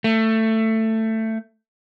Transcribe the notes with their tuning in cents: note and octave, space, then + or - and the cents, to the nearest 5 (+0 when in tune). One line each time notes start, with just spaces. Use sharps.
A3 +15